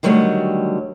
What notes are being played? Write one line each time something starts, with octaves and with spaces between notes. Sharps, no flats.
D3 D#3 F#3 G3 A3